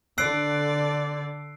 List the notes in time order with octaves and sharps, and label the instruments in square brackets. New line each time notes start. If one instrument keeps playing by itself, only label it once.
[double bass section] D3 [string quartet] D5 [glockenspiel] E6 C7 D7 [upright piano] F#6